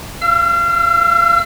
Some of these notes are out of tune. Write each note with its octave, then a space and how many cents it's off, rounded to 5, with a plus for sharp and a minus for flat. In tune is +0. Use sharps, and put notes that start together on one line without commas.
F5 -30 E6 +35